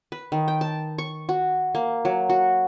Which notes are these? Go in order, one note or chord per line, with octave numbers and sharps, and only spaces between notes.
B4
D#3
G5
A5
C#6
F#4
A#3
F#3
F#4